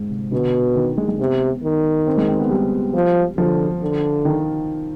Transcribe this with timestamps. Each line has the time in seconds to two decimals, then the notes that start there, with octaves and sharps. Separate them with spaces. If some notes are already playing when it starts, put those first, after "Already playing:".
Already playing: G#2
0.10 C3
0.32 B2 D3
0.76 D#3
0.98 G#3
1.08 G#3
1.19 C3 B3
1.64 D#3
2.07 C4
2.18 G#3
2.29 C4
2.40 B3
2.51 G3
2.94 F3
3.37 D3 F3
3.82 D3
4.25 D#3